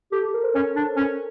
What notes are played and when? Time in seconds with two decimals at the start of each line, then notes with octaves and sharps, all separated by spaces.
0.12 G4 A4
0.23 A4
0.34 A#4
0.44 C5
0.54 C#4 C#5
0.76 D4
0.97 C#4